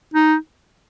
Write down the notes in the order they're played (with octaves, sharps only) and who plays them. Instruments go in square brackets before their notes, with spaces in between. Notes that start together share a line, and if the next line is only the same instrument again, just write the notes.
[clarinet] D#4